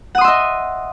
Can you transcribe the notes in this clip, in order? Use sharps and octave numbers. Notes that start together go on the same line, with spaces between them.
D#5 E5 F#5 C6 D#6